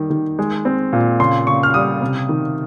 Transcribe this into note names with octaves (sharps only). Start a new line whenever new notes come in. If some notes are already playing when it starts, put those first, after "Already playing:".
Already playing: D#3 G3
D#3
G#3
C4
A#2
C#3 C6
C#3 C#6
F6
G3 D#6
C3
D#3